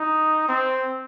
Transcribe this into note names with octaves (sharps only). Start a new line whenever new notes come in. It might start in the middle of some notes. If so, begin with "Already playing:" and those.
Already playing: D#4
C4